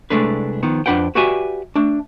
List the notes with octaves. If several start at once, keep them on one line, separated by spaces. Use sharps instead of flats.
C2 A#2 G#3 A3 D4 B4
D#3 F3 B3
F2 D4 B4 F#5 G5
F#4 G4 B4 D5 E5 G#5
A3 D4